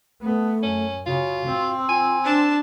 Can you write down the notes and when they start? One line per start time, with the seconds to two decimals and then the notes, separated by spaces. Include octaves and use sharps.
0.22 A3 B3
0.63 F#2 C#4
1.06 C#3 F4 F#4
1.47 C4
1.89 F4 G#5
2.24 D4 C5 A5